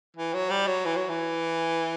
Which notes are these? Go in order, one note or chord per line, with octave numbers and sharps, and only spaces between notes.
E3
F#3
G3
F#3
E3
F#3
E3